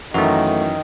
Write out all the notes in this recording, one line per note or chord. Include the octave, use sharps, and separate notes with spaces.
F#2 D#3 E3 A3 F#4